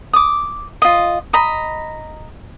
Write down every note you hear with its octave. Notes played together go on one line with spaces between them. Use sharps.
D6 D#6
F4 D#5
D#5 A#5 B5